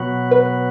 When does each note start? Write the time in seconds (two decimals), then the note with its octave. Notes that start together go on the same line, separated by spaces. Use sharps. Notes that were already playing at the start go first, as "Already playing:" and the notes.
Already playing: B2 F#3 B3 F#4
0.31 B4